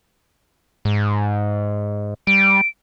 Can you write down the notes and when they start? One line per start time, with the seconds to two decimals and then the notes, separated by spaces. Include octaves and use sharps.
0.85 G#2
2.27 G3 D7